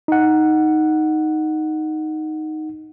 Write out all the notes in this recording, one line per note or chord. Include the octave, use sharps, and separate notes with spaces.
D#4 F#5